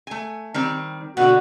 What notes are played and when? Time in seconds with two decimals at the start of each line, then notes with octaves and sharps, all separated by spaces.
0.07 A3 G#5
0.54 D#3 G3 C4
1.17 B2 D3 F#4 D5 F#5